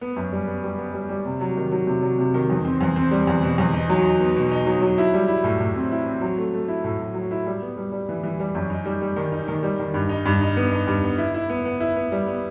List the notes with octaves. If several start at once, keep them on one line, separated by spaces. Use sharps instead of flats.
B3
F#2
G3
B3
G3
B3
G3
G3
C3
F#3
D#3
F#3
C3
F#3
C3
D#3
E2
C4
E2
C4
G3
E2
B2
E2
D#4
F#3
D#4
B3
B2
D#4
F#3
F#3
E4
G3
E4
A2
A2
C4
E4
C4
F#3
A3
A3
E4
A2
F#3
F#3
E4
G3
B3
G3
G3
E3
E3
G3
F#2
D#4
G3
G3
D#3
D#4
D#3
G3
D#3
G2
D#4
G2
D#4
B3
D#4
G2
B3
E4
E4
B3
B3
E4
B3
G3
B3